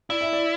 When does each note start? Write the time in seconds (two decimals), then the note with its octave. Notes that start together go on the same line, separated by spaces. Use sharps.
0.10 E4 D5
0.21 E5
0.33 D5